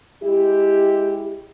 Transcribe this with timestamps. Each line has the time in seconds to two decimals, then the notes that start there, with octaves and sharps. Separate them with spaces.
0.22 G#3 E4 G4